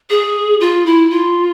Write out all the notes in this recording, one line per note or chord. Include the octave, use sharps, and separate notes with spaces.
G#4
F4
E4
F4